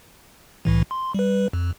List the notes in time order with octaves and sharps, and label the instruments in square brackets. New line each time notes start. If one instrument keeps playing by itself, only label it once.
[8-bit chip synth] C2 A2 E3
C6
G3 B4
F2